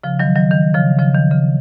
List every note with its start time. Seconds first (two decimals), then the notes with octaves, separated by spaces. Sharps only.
0.04 C#3 F3
0.19 D#3 F#3
0.35 D#3 F#3
0.51 D#3
0.75 C#3 F3
0.99 C#3 F3
1.15 D#3
1.31 C#3